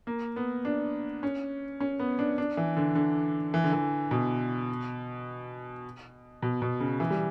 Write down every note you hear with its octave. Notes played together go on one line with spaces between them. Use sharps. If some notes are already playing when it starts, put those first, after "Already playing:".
A#3
B3
D4
C#4
C#4
B3
D4
D4
E3
D3
D3
E3
D3
E3
B2
B2
B2
C#3
E3
G3